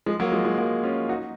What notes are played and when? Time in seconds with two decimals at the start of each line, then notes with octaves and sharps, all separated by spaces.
0.06 F3 G#3
0.20 F#3 A#3
0.32 F3 G#3
0.45 F3 G#3
0.58 F#3 A#3
0.83 C#4 F4
1.09 D#4 F#4